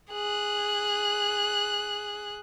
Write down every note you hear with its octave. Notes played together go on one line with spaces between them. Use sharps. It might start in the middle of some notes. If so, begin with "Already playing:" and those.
G#4 F#6